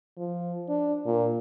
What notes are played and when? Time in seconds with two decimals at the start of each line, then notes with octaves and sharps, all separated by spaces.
0.18 F3
0.69 D4
1.06 A#2